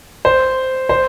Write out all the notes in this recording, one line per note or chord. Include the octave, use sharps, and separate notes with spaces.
C5
C5